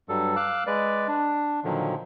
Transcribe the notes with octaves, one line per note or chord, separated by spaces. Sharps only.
G2 F#3 G3 A4
F5 D6 E6 F#6
G#3 B4 D5
D4
A#2 D3 D#3 F3 F#3